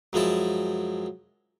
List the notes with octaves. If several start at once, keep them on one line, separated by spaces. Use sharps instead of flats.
F#2 F3 G#3 E4 A5